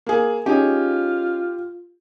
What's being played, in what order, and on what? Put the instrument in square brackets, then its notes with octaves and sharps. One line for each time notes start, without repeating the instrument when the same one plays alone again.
[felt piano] A#3 G#4
[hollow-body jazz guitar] C#4 D#4 G#4 [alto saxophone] F4 [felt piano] G4